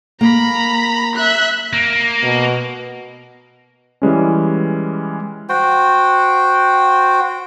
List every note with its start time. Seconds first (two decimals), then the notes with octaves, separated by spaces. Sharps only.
0.21 A#3 A#5 B5
1.16 E5 F#6
1.73 A#3
2.23 B2
4.02 E3 G3 G#3 C#4
5.49 F#4 C5 G5